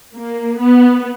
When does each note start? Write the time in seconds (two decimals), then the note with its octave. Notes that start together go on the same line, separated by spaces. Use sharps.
0.15 A#3
0.59 B3